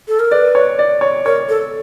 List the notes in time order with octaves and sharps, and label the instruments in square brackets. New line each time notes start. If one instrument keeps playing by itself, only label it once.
[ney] A4
A#4
[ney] B4 [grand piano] D5
[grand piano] C#5
D5
C#5
[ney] A#4 [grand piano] C#5
[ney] A4